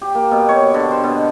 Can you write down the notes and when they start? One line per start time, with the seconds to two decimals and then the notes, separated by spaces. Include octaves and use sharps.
0.01 G4
0.15 A#3
0.31 B2
0.49 C#5
0.74 D3
0.91 C5
1.04 B2